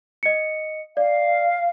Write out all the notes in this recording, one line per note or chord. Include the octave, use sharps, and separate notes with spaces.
D#5 C#7
D5 F5